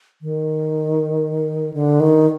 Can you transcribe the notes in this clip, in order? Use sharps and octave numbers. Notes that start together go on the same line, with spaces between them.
D#3
D3
D#3